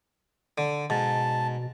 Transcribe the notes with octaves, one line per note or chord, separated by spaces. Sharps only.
D3
G#2 B2 A5